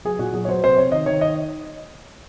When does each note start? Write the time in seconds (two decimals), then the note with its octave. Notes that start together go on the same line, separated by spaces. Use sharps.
0.05 F#3 G#4
0.19 A#2 F#4
0.34 F#3 G#4
0.45 C#5
0.48 F#3 C5
0.63 C3 C5
0.78 C3 C#5
0.92 D#3 D#5
1.06 D#3 C#5
1.21 D#5